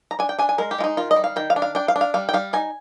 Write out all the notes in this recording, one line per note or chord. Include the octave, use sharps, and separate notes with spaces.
A#5
D4 G#5
G5
D4 G#5
G#5
G#3 A#4
G4
G#3 F4
D#4
D#3 F4
D#5
G3
F5
D#3 G5
F5
D4
F5
D4 G5
F5
D4
F5
G3 F5
G5
G3 F5
D#4 G#5